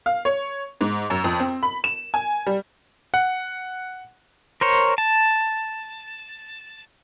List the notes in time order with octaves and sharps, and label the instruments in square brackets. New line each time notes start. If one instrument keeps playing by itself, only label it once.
[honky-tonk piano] F5
C#5
G#2
F#2
F2
C4
B5
E7
G#5
G3
[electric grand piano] F#5
[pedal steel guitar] A#4 C5 C#5
A5